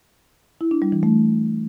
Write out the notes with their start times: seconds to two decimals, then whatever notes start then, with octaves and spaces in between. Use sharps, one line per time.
0.61 E4
0.71 D4
0.82 G3
0.92 E3
1.03 A3